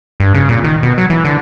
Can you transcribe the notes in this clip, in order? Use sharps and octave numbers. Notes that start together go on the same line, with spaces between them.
G2
C#3
A#2
D#3
B2
F#3
E3
D3